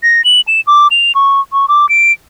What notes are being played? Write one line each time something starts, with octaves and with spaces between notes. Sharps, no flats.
A#6
F#7
E7
D6
F7
C#6
C#6
D6
D7